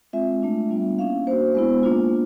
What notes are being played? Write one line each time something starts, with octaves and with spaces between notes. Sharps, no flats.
G#3 C4 F4 E5
A3 D4 F4
G3 B3 D4 F4
A#3 C#4 E4 F5
A#3 D4 F#4 C5
G#3 B3 E4
A#3 D4 F4